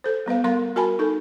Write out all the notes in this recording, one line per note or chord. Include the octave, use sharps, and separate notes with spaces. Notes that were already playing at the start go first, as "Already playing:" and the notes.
A4 C5
G3 B3 B4 F5
G3 B3 A#4 F5 C6
F#4 A#4 G#5 A5 B5
D#4 A4